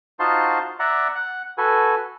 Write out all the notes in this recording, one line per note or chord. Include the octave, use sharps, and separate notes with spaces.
D#4 F4 F#4 C5 A5 C6
D5 E5 F#5 A#5
F#5
F#4 A4 B4 G#5